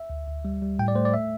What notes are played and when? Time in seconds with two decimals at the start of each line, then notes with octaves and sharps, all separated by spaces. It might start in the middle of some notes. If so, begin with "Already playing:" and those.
Already playing: E5
0.10 D2
0.28 D2
0.45 G3
0.62 G3
0.79 A2 G5
0.88 D5
0.95 A3 C5
1.05 D5
1.14 E5